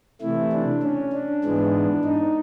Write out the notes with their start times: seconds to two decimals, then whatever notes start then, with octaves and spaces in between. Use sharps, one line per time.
0.21 C3 E3 A3 E4
0.52 D4
0.83 C#4
1.13 D4
1.44 G#2 E3 G#3 B3
2.05 D#4